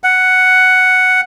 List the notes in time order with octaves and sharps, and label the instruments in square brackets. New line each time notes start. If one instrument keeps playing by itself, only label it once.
[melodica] F#5